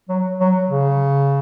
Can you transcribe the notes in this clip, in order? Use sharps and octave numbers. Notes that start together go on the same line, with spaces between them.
F#3
F#3
C#3